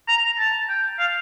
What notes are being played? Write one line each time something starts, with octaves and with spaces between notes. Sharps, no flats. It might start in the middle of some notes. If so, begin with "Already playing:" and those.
A#5
A5
G5
F5